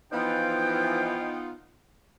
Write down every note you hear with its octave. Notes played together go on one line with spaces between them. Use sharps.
E3 F3 B3 D#4 F4 G5